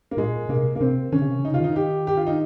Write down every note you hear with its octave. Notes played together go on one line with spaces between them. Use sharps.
A#3
A#2 G#3
C3 A#3
A#3
C3 C4
D#3 C#4
C#3
C3
C#3
D#4
F4
D#3 D#4
G4
G4
F4
D#4